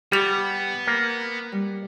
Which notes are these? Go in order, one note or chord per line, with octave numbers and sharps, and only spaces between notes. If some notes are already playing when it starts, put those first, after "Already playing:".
G3 B3 G4 F7
A#3
G3